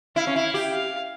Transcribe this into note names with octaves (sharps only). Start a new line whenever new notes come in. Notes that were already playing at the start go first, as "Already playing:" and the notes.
E4 F5
C#4
E4
G4
F5